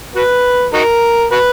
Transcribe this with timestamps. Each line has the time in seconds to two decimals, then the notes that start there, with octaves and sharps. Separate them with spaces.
0.15 F#4 B4
0.74 D#4 F#4 A#4
1.31 F#4 B4